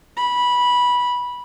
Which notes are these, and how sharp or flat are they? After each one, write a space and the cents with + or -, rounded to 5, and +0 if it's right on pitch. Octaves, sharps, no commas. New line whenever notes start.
B5 -15